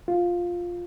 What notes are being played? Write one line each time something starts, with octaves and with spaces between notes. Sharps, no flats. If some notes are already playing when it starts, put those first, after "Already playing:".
F4